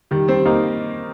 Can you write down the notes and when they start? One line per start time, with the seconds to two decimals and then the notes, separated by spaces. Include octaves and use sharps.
0.11 D#3 G3
0.28 G3 C4
0.45 A#3 D#4